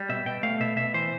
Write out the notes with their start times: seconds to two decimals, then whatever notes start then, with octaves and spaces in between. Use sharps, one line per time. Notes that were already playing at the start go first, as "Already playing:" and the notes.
Already playing: G3
0.09 B2 E5
0.26 B2 G5
0.43 A3 F5
0.60 B2 E5
0.77 B2 E5
0.94 E3 C5